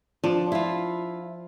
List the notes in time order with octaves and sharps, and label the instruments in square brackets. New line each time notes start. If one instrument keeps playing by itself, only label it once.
[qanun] F3 [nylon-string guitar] D4
[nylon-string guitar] E4 F4